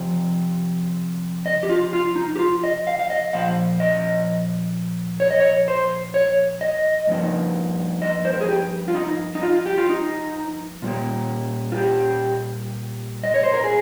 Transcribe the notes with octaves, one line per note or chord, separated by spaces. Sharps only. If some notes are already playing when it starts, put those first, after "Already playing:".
Already playing: C3 F3
D#5
G4
F4
F4
D#4
G4
F4
D#5
F5
F5
D#5
A#2 F3 F5
D#5
C#5
D#5
C#5
C5
C#5
D#5
G2 F3 A#3 D#4
D#5
C5
A#4
G#4
G4
F4
D#4
D#4
F4
G4
F4
D#4
A#2 G3 A#3
F4
G4
D#5
C#5
C5
A#4
G#4